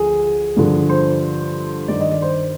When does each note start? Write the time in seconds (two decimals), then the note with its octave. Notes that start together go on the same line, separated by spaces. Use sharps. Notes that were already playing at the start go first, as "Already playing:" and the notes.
Already playing: D2 F3 G#4
0.57 G2 D3 F3
0.89 C5
1.88 G2 D#3 D5
2.00 D#5
2.11 D5
2.22 C5